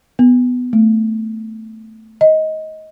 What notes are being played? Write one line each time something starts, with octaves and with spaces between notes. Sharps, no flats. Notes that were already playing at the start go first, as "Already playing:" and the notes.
B3
A3
D#5